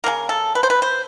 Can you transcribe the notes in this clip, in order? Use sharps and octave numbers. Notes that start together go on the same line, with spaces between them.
C#3 F#3 A#3 A#4
A4
B4
C5
B4
C5